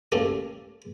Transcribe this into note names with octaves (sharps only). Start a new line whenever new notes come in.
A3 A#3 C#4 G4 A4